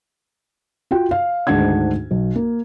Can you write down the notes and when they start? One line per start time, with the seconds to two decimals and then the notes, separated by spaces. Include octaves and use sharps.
0.91 F4 F#4 G5
1.11 F5
1.47 D2 G#2 D#3 D4 F#5 G#6
2.11 B1
2.36 A#3